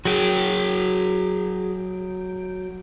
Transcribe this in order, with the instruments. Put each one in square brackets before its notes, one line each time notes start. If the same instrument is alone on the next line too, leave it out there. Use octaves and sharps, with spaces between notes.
[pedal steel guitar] F#3 G5 [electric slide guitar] F#4 G#4